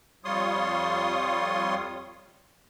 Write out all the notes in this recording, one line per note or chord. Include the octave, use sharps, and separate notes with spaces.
F2 G3 F4 C#5 C6 D#6